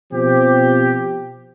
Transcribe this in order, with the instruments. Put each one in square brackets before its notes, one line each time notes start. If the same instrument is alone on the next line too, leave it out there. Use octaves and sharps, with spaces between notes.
[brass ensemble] B2 F3 C4 G4